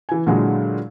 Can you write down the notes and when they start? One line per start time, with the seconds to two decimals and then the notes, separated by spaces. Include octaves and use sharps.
0.09 E3 G#5
0.27 A#2 D3 F#3 G#3 E4